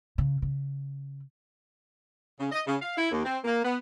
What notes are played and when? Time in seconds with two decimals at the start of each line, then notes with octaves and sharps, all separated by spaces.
0.18 C#3
0.42 C#3
2.40 C#3
2.52 D#5
2.67 C#3
2.82 F5
2.97 E4
3.11 D#2
3.25 C4
3.44 A#3
3.65 B3